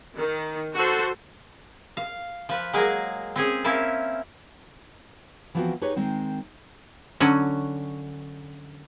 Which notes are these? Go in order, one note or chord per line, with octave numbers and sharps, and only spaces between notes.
D#3
F#4 A4 C5
F5
F3 B4
F#3 G#3 A#3 G#4
C4 C#4 G#4
A#3 C4 C#4 E4 E5 A5
E3 F3 B3 C4 D4 F#4
D#4 G4 G#4 B4 C#5
D#3 G#3 C4 D#4
D3 F#3 C#4